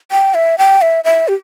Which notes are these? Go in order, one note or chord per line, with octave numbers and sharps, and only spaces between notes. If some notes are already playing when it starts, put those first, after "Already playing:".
G5
E5
G5
E5
E5
G4